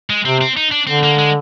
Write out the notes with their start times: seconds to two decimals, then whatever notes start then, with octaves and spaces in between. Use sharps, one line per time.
0.10 G#3
0.25 C3 C4
0.41 C4
0.57 D#4
0.71 D4
0.87 D3 C4
1.03 A#3
1.18 G#3